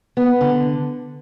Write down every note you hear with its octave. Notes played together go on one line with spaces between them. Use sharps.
B3
D3